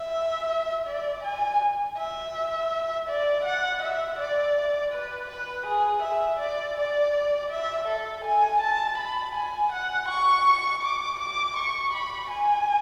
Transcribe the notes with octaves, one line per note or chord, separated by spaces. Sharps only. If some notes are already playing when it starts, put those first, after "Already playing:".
Already playing: E5
D5
G#5
E5
D5
F#5
E5
D5
B4
B4
G#4
E5
D5
D5
E5
A4
G#5
A5
B5
G#5
F#5
C#6
D6
D6
C#6
B5
G#5